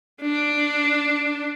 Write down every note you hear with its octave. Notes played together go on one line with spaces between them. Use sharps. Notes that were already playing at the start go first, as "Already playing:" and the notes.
D4